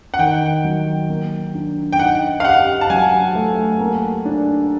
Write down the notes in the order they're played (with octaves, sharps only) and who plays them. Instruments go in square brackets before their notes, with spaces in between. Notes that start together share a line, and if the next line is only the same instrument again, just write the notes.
[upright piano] F#5
[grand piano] D#3 [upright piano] G5
[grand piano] F#3
A#3
D4
[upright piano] G5
[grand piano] D#4 [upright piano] F#5
[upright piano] F5
[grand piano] G4 [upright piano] F#5
[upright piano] A5
[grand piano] F#3 [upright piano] G#5
[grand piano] A3
A#3
D4